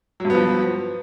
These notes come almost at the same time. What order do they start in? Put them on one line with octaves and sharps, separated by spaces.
F#3 G2 B3 F3